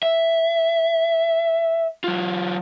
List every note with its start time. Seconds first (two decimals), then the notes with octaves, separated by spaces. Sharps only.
0.03 E5
2.04 F#3 F4